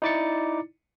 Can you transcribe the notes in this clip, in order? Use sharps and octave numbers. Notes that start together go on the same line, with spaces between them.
D#4 E4 D5 D6 A6 C#7